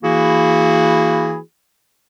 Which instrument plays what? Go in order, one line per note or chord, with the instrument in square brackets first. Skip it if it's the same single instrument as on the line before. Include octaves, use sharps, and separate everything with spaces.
[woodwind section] E3 A#3 E4 F#4 G#4